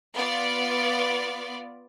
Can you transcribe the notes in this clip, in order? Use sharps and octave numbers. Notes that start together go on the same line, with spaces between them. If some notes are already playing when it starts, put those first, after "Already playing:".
B3 F4 D5